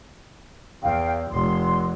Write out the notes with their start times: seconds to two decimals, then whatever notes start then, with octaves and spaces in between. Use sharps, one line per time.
0.83 E2 F5 G5
1.31 F1 C6